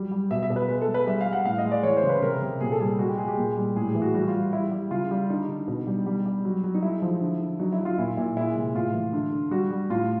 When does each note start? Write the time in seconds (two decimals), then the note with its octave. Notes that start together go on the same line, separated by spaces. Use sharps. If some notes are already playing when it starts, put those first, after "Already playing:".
Already playing: F#3 G3
0.11 G3
0.31 B2 E5
0.43 E5
0.50 B2
0.56 B4
0.68 G#3 B4
0.81 A4
0.88 G#3
0.94 B4
1.07 G3 E5
1.21 F5
1.26 G3
1.33 F#5
1.45 A2 F5
1.58 D#5
1.65 G#3
1.72 D5
1.83 E3 C#5
1.97 C5
2.03 C#3
2.09 B4
2.22 C3 A#4
2.42 C3
2.61 A#2 G#4
2.72 A4
2.80 G3 G#4
2.99 G#3 F#4
3.08 G4
3.18 G#3 G#4
3.28 G4
3.38 A#2
3.57 G3
3.76 A2 G#4
3.89 G#4
3.95 E3
4.02 F#4
4.14 G3 F#4
4.28 F4
4.34 G3
4.52 G3 E4
4.72 G3
4.91 C#3 F4
5.11 G3
5.30 D3 D#4
5.49 D3
5.68 B2
5.87 G3
6.06 G3
6.26 G3
6.45 F#3
6.64 F#3
6.74 D#4
6.83 G#3 E4
7.02 F3
7.21 D3
7.40 D3
7.59 F#3 D#4
7.73 E4
7.80 F#3
7.85 F4
7.98 A#2 E4
8.17 A#2 E4
8.37 G#3 E4
8.56 C3
8.74 A2 F4
8.94 E3
9.13 D3
9.32 D3
9.51 G3 F#4
9.71 G3
9.90 A2 F4